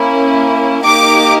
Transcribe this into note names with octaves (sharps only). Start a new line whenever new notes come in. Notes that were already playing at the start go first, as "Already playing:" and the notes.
Already playing: A#3 C#4 E4
A#3 D#4 G4 D6